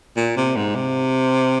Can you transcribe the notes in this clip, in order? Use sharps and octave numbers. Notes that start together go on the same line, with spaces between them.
A#2
C3
G#2
C3